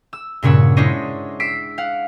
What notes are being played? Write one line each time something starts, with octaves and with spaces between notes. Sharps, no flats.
E6
G2 A#2 C#3 C#5 F#5 E6
G#3 D4 E4 C5 C#5 D#5
E6 B6 C7 D7
F5 F#5